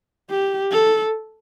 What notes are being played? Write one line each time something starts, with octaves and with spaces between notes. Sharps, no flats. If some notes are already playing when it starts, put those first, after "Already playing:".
G4
A4